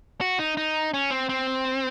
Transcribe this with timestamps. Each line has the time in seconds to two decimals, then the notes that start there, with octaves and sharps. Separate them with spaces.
0.21 F#4
0.39 D#4
0.57 D#4
0.94 C#4
1.10 C4
1.29 C4